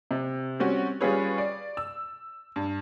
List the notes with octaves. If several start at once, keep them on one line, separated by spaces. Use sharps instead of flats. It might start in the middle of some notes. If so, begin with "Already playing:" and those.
C3
G3 C4 C#4 F#4
G3 C#4 F4 G#4 B4 C#5
D5
E6
G2